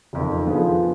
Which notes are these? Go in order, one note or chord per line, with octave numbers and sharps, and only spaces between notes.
F#1 F2 D#3
D3 F3 B3 F4 G#4